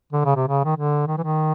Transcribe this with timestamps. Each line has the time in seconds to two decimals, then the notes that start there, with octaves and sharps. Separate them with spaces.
0.13 D3
0.25 C#3
0.36 C3
0.48 C#3
0.65 D#3
0.77 D3
1.07 D#3
1.18 E3
1.24 D#3